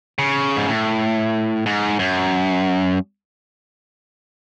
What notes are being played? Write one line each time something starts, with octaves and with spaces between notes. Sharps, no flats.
C#3
G#2
A2
G#2
F#2